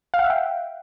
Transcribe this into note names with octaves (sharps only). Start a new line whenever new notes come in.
F5
F#5
E5
G5